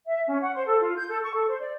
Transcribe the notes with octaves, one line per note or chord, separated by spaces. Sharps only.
E5
C#4
F#5
C5
A4
F4
G6
A4
C#6
A4
C5
D5